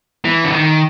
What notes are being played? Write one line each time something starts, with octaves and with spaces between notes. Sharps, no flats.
E3
D3
D#3